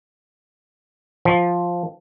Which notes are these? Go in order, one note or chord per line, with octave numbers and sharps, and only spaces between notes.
F3